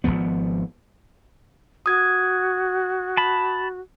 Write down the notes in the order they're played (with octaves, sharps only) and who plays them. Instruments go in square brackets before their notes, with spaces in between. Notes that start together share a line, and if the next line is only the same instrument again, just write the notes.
[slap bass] G#1 F#2 F3 B3
[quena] F#4 [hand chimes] D#6 G#6
[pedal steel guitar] A5 B5